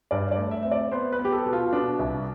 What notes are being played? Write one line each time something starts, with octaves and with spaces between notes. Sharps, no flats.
G2 D5
D5
A3
E5
C4 E5
D5
B3 C5
B4
B3
G4
A4
B2
F4
B2 D4
C2